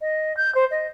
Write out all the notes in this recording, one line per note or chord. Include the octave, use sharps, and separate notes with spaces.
D#5
G6
C5
D#5